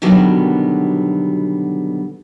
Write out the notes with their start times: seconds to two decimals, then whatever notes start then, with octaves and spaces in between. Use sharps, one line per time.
0.02 B2 D3 D#3 F#3 G3 B3